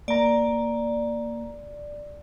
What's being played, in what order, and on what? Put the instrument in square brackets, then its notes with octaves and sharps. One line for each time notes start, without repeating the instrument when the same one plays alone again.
[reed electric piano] A#3 A#5 [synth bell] D5